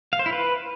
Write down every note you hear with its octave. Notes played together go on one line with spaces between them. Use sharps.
F5
C5
E4
B4